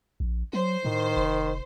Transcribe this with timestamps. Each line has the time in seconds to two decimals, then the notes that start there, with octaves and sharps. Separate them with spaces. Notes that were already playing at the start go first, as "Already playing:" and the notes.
0.20 A#1
0.53 F#3 C5
0.85 A2 D#3
1.17 F1